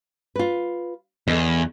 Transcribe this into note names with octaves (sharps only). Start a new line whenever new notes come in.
F4 B4
E2 A4 D#5